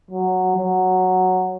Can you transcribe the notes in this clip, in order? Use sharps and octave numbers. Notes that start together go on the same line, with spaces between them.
F#3
F#3